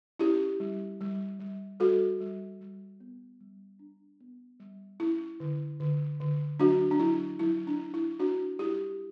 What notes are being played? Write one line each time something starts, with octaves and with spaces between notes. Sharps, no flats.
C#4 E4 G4
G3
G3
G3
G3 F#4 A4
G3
G3
B3
G3
D4
B3
G3
C#4 E4
D3
D3
D3
F#3 D4 F#4
D4
F#3 E4
F#3 E4
D4
D4
E4
D4 F#4
G3 E4 G4